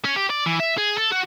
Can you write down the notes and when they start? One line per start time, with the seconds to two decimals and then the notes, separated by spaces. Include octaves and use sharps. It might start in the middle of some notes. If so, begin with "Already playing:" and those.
0.05 C#4
0.16 G4
0.30 D5
0.46 E3
0.60 E5
0.77 G#4
0.97 A4
1.11 F#4